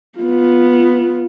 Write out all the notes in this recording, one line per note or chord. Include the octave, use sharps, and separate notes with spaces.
B3 F4